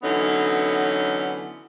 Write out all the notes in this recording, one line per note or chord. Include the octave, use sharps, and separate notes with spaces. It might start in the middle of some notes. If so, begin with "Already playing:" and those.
D3 E3 F#3 B3 C#4 D#4